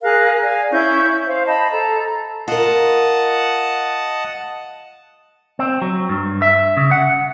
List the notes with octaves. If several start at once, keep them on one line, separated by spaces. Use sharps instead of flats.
G#4 A#4 F5 F#6
D5 F5 G#5
C#4 E4 C#6 G6
C5 F5
D#5 A5 B5
A4 A#5
F4 A#4 D#5 F#5 A5
C4
F#3
G2
E5
C#3
F#5